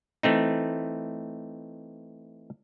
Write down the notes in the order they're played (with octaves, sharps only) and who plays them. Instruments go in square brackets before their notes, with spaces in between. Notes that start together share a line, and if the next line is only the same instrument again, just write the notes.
[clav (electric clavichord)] E3 A3 C4 D#4